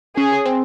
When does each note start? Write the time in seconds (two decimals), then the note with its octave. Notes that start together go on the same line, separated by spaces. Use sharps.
0.17 C#4 G#4
0.45 C4